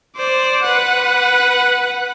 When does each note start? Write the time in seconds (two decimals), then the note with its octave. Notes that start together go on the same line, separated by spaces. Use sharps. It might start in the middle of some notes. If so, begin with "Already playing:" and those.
0.16 C5 D5
0.63 B4 F#5